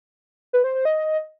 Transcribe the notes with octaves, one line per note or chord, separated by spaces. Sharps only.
B4
C5
C5
D#5